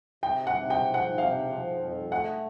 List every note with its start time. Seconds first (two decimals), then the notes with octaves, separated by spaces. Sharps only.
0.23 C3 G5
0.47 F#5
0.55 C3
0.70 G5
0.87 F3
0.94 F#5
1.18 C3 F5
1.49 F3
1.80 F2
2.11 A3 F#5